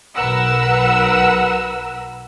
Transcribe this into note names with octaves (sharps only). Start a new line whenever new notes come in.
B1 A#4 B4 F#5 E6